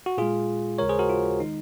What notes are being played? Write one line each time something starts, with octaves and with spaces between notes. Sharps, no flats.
F#4
A#2 G#3 F4 G#4
D#2 C#3 G#3 A#4 C#5
G#4 C5
F#4 A#4
F4
D#3 G#3 D#4